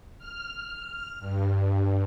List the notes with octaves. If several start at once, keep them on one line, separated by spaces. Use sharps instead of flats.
F6
G2